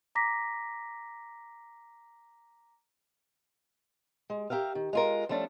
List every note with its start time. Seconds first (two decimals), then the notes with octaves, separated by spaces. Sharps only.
0.15 A#5 D6 A#6 B6
4.30 G#3
4.50 G4 A#4 E5 F5
4.75 D#3
4.93 G#3 F4 A#4
5.29 F3 G3 A3 C#4 D4